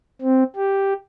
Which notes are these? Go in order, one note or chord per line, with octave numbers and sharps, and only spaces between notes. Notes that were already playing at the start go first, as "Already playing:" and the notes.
C4
G4